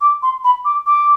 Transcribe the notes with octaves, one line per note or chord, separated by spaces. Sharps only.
D6
C6
B5
D6
D6